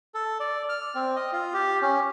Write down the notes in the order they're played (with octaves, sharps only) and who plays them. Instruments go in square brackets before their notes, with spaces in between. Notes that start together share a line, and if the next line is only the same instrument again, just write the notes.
[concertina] A4
D5
F6
C4
D#5
F4
G4
C#4